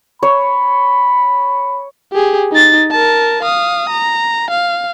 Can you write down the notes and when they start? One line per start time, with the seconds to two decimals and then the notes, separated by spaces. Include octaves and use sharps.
0.23 C#5 B5
2.13 G4 G#4
2.52 D#4 A6
2.91 A#4 A5
3.42 F5 D#6
3.89 A#5
4.50 F5